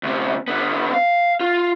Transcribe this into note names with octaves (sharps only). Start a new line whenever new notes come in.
D2 C3
D3 B3
F5
F4